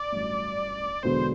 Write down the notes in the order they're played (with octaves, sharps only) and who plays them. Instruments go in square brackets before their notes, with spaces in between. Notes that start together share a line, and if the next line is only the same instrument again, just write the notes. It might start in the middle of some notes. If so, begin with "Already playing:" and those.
Already playing: [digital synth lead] D5
[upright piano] A1 G2 F#3
[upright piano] E1 E2 D3 F#3 B3 [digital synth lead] C5